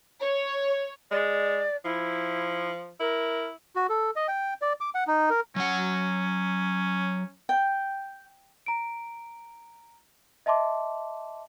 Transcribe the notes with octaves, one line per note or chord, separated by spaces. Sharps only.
C#5
G#3 D5
F3 E4
E4 A#4
F#4
A4
D#5
G5
D5
D6
F#5
D#4
A#4
F#3 C#4 F#5
G5
A#5 D7
D#5 E5 A5 C6 D6